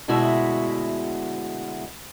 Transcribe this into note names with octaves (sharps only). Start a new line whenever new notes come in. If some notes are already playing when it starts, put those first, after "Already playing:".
D2 B2 G#3 E4 F#4 E5